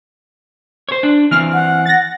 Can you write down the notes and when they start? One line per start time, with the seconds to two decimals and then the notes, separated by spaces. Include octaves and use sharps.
0.89 C5 C#5
1.03 D4
1.31 E3 C4 F6
1.53 F#5
1.86 A6 A#6